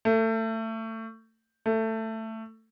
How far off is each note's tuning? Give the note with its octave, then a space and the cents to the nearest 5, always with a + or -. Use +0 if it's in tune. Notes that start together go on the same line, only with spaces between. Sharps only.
A3 +25
A3 +15